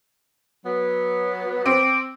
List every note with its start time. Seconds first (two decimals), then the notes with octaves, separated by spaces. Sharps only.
0.64 F#3 B3
1.66 C4 D6